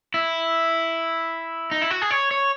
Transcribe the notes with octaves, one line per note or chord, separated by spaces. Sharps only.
E4
D#4
E4
F#4
G#4
C#5
C#5